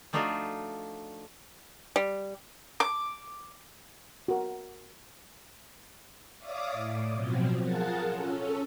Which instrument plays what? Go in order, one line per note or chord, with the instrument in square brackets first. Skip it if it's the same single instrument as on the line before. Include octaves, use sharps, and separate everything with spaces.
[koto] F3 A3 D4 D#4 F4 F#4
[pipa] G3
[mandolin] D6
[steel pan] F#4 A#4
[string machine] C#5 D5 E5 F5 D6 D#6
A2
B2 F3 F#3 C4
F4 G#4 A#4 F#5 A5
C#4 A4